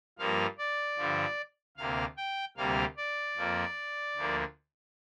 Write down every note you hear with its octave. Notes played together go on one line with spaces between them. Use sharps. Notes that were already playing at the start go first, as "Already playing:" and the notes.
G2 F3 A#3 F5
D5
G2 D3 F3
D2 C3 A#3 F5
G5
D2 C3 G3 A#3 F5
D5
F2 F3 A#3
D2 D3 F3 A#3